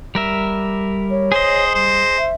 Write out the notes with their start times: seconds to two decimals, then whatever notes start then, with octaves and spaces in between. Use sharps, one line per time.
0.15 G3 A#4 E5
1.10 C#5
1.32 G#4 C5 D#5
1.74 G3 C5
2.18 E5